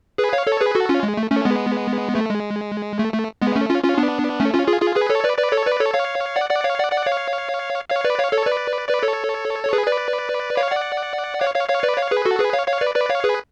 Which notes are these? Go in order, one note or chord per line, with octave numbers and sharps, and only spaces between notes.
G#4 B4
C#5 F5
A4 C#5
G#4 B4
F#4 A4
C#4 F4
G#3
A3
A3 C#4
G#3 B3
A3
G#3
A3
A3
G#3 B3
A3 C#4
C#4 F4
C#4 F4
B3 D4
A3 C#4
C#4 F4
F4 G#4
F4 G#4
G#4 B4
A4 C#5
B4 D5
B4 D5
A4 C#5
B4 D5
A4 C#5
C#5 F5
D5 F#5
D5 F#5
C#5 F5
D5 F#5
D5 F#5
C#5 F5
C#5 F5
B4 D5
C#5 F5
A4 C#5
B4 D5
B4 D5
A4 C#5
C#5
G#4 B4
B4 D5
C#5 F5
D5 F#5
C#5 F5
C#5 F5
C#5 F5
B4 D5
C#5 F5
G#4 B4
F#4 A4
G#4 B4
C#5 F5
C#5 F5
B4 D5
B4 D5
C#5 F5
G#4 B4